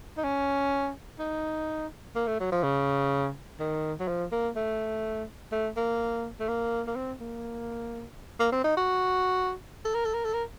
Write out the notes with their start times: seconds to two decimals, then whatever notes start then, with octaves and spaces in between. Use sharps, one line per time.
0.18 D#4
0.24 C#4
1.19 D#4
2.16 A#3
2.27 A3
2.40 F#3
2.52 F3
2.63 C#3
3.60 D#3
4.00 F#3
4.08 F3
4.32 A#3
4.56 A3
5.52 A3
5.76 A#3
6.40 A3
6.48 A#3
6.87 A#3
6.96 C4
7.20 A#3
8.40 A#3
8.52 C4
8.64 D#4
8.77 F#4
9.85 A4
9.95 A#4
10.05 A4
10.14 A#4
10.24 A4
10.34 A#4